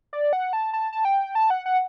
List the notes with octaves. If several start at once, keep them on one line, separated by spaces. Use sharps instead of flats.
D5
F#5
A5
A5
A5
G5
A5
F#5
F#5